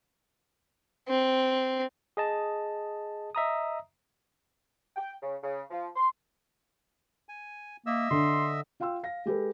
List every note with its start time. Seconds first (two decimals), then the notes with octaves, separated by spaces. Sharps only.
1.08 C4
2.17 G#4 D#5 A5
3.35 D#5 E5 A#5 D#6
4.96 G5
5.22 C#3
5.43 C#3
5.70 F3
5.96 C6
7.29 G#5
7.86 A#3 D#5 E5 E6
8.11 D3 C6
8.80 F4 F5 G5 C6 E6
9.03 F5 A#6
9.26 G#3 G4 A4 B4